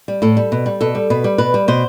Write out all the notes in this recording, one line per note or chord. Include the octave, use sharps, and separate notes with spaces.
G3
A2 A4
G3
B2
G3
B2 A4
G3
B2 B4
G3
B2 B4
G3
B2 C5